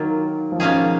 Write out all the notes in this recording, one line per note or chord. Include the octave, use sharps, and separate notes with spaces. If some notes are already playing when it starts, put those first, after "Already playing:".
Already playing: D#3 F#3 A#3 F4
F3
B2 D#3 A#3 C#4 G#4
F3